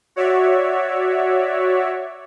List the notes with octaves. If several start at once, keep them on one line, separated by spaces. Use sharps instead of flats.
F#4 C#5 D5 E5